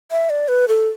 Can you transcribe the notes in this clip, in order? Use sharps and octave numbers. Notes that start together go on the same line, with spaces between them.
E5
D5
B4
A4